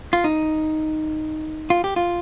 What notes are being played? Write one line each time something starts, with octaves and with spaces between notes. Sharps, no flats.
F4
D#4
F4
G4
F4